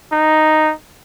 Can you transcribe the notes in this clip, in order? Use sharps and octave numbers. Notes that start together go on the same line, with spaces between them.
D#4